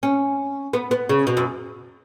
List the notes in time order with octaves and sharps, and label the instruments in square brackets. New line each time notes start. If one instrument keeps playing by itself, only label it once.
[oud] C#4
B3
B3
C#3
B2
F#2